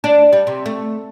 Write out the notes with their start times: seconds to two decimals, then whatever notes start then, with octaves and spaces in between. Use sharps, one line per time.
0.04 D4
0.33 G3
0.47 C3
0.66 A3